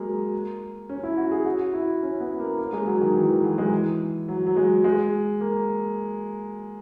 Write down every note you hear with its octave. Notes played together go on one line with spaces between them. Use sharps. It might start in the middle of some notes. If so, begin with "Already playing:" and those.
Already playing: F#3 G#3 A#3
C#4
E4
F#4
G#4
F#4
E4
C#4
B3
A#3
A#3
G#3
F#3
D#3
E3
E3
F#3
G#3
E3
F#3
F#3
G#3
G#3
A#3